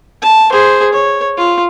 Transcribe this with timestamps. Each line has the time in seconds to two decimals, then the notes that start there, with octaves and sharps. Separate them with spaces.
0.22 A5
0.52 G#4 C5
0.93 C#5
1.37 F4